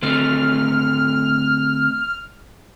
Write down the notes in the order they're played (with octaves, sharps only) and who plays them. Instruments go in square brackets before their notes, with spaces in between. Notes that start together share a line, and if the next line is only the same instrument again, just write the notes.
[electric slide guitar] D3 A3 C4 [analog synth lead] F6